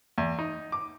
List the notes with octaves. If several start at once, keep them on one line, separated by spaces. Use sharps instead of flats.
E2
D#4
D6